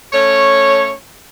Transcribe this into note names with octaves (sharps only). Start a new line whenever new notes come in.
A3 C#4 C#5